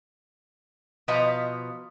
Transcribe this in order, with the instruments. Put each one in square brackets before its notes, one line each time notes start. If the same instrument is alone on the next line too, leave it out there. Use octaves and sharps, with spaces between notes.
[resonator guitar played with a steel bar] B2 F3 B4 D#5 F5 A#5